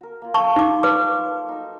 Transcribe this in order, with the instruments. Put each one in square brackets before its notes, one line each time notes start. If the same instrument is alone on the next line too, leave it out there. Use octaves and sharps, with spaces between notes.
[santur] F#4 A#4
A#3 F4
[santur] A#3 A4 [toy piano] A5 C#6
[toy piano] D#4 D6 [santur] G4 C6
[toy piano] B4 D6
[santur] D#4 F#4